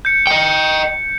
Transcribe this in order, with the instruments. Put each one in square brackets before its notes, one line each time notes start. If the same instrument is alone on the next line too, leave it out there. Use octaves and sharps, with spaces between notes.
[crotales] G6 C#7
[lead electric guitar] D#5 G5